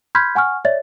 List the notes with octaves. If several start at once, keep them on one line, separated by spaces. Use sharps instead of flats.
B5 C6 F6 G6 G#6 B6
F#5 G#5 C#6 F6
C#5 D5 E5 A6